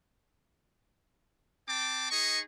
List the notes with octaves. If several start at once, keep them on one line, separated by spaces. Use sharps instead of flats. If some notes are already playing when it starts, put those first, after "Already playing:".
C4 G5 A5 D6
D#4 G#4 D#5 C#6